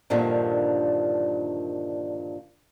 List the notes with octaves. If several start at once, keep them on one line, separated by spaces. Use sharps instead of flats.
G2 A#2 D3 D#3 F3